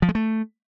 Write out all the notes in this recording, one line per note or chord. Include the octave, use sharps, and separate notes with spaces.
F3
G#3
A3